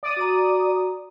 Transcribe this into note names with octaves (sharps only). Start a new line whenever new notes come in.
D5 D#6
F#4 A#5